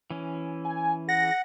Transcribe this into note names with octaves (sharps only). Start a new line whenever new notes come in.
E3 C#4
G#5
G#4 F#5 A#6